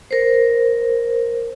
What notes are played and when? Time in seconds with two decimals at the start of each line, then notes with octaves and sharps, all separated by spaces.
0.11 A#4 C5